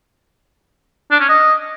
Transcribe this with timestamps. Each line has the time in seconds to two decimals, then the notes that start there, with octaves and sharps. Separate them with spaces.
1.11 D4
1.20 C#4
1.29 D#5